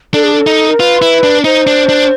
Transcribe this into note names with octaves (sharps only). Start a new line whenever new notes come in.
D4 A4
G#4
A4
D#4
A#4
F4 B4
E4
D4
D#4 C5
D4
D4